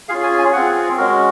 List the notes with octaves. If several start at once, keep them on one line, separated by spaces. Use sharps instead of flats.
C#4 F4 G#4 F5
G#5
G#5
C4 F4 G#4 F#5
G#3 C#4 F#4 A#4